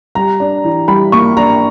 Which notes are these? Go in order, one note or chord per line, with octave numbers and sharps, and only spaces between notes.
G3 A#5
D4
E3
G3 B5
A#3 C#6
D4 A#5